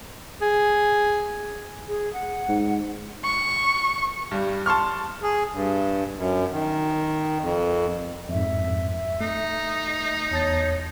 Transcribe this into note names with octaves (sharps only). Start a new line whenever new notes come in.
G#4
G#4
F#5
G#2
C#6
G2 G3
A5 C6 C#6 F6
G#4
G2
F#2
D#3
F2
F2 G#2 E5
A3 D#4
E2 C#5 A5 A6